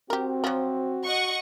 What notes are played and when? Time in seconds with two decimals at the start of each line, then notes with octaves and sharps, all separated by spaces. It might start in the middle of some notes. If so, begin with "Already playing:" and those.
0.10 C4 F#4 G4 A#4
0.44 F3 F#3
1.05 D#5 F#5 C#6